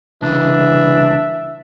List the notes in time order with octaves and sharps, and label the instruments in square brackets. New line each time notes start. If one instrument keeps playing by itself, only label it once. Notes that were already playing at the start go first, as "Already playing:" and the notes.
[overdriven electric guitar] C2 C#3 [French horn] E3 [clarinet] D4 [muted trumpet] E5